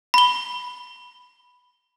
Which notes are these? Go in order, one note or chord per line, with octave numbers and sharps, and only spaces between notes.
B5 G7